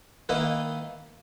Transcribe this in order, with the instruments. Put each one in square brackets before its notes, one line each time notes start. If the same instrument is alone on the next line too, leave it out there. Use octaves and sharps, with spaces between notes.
[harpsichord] D#3 A#3 E4 B4 D#5